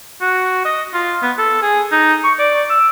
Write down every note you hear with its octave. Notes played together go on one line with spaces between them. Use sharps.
F#4
D#5
F4
B3
A4
G#4
D#4
C#6
D5
E6